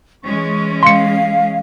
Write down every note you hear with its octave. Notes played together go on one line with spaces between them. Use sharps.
E3 G#3 C#4 C#6
F5 C6 C#7